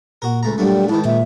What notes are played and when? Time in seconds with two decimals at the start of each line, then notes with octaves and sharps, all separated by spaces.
0.22 A#2 F#4 A#4
0.43 C#2 A3 A#5
0.58 A#2 F#3 G3 A3 D4
0.89 G#2 D#3 E4 A5
1.05 A#2 E5